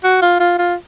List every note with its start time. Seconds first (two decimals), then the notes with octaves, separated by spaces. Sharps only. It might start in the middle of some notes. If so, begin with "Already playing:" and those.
0.04 F#4
0.22 F4
0.40 F4
0.58 F4